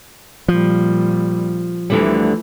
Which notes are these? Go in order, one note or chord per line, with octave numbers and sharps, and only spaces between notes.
A#2 F3 G3
D2 D3 E3 G3 A3